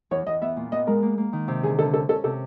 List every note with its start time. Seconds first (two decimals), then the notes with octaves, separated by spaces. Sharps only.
0.11 E2 C#5
0.27 E2 D#5
0.42 B3 E5
0.56 A#2
0.72 B3 D#5
0.87 G#3 A#4
1.03 A#3
1.18 A#3
1.33 D#3
1.48 C3
1.63 D3 G#4
1.78 D3 A4
1.93 C#4 A4
2.09 C#4 A4
2.24 C3 A4